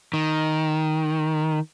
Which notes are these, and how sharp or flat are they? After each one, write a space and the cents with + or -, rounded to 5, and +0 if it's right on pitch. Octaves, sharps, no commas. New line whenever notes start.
D#3 +5